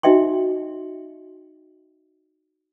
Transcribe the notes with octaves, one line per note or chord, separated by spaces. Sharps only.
D#4 F#4 D#5 E5 G5 C6